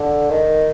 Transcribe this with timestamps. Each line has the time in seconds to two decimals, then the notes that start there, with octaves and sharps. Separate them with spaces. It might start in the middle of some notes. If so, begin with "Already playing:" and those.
Already playing: D3
0.30 D#3